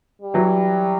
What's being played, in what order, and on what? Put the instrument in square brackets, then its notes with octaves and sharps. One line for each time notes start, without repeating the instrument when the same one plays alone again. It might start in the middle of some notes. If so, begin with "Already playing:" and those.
[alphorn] G3
[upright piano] E3 F#3